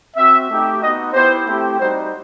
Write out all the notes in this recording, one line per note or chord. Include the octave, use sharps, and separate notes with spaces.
C4 F#4 E5
A3 D#4 G4
B3 D#4 F#4 D#5
B3 E4 G4 C5
A3 C4 E4 G4
G3 D#4 F#4 C5